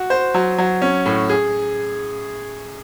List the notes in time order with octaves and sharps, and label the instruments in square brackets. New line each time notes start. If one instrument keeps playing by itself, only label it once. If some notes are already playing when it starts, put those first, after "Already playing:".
Already playing: [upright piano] F#4
C5
F#3
F#3
C#4
A2
G#4